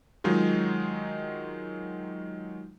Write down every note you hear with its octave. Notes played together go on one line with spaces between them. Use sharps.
D#3 F#3 G#3 D#4 F4